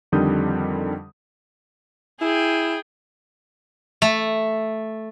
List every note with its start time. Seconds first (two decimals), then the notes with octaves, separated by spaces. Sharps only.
0.12 F2 D3 D#3 G3 D#6 G6
2.21 E4 G#4 G5
4.02 A3